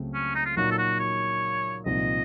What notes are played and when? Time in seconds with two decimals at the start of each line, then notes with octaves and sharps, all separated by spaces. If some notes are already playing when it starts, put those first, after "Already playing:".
Already playing: C#2 C#3 F#3 A3 C4
0.14 C#4
0.35 D#4
0.46 F4
0.57 A#2 F#3 A#3 D#4 F#4
0.71 A4
0.78 F#4
1.00 C#5
1.86 C2 A#2 F3 C4 D#4 D#5